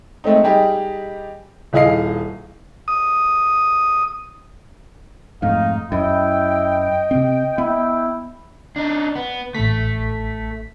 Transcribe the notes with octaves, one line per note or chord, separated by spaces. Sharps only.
G#3 A3 C4 D#4
G3 D#4 G4 G#4
D#1 E4 G#4 D#5 F5 C7
D#6
F2 G#2 A3 D#4 F5
F#2 E4 D#5 G5
C3 C4
B3 E4
D4 D#4
B3
A1 A3 B6